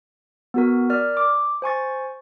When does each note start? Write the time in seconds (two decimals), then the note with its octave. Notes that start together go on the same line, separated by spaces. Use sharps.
0.54 B3 F#4 A#4
0.90 A#4 D5 F6
1.17 D6
1.62 C5 G#5 C#6 A6